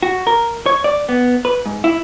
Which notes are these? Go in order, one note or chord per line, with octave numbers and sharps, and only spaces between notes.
F#4
A#4
C#5
D5
B3
B4
G#2
E4